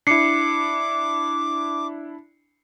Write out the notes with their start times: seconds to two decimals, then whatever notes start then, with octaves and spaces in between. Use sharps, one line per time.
0.07 D4 E4 D6 C7 C#7